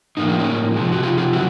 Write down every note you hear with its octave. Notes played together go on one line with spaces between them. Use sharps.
A2 F3 A#3 D#4
D4
C#4 D#4
C3 F3 G#3
F#4
F4 G4
F4 G4
C#3 F#3 E4 F#4